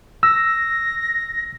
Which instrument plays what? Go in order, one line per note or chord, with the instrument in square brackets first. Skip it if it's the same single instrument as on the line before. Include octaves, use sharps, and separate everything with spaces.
[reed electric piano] E6 [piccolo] A#6